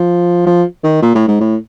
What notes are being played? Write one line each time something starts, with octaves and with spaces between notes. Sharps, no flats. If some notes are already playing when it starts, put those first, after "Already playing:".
Already playing: F3
F3
D#3
A#2
A2
G#2
A2